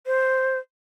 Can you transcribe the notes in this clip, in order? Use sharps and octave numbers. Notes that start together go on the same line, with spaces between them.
C5